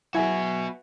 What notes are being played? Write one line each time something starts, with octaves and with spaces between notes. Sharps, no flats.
F#3 B3 E4 F#4 G#4 E5 G#5 G#6